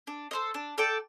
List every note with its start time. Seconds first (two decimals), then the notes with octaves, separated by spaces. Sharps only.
0.07 D4
0.31 A4 C5 D#5
0.54 D4
0.78 A4 D5 G5